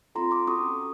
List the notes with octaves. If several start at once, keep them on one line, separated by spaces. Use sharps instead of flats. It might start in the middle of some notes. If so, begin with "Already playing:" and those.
C4 F4 A4 A#5 C6
C6 D6
C#4 F#4 A4 C#6 D#6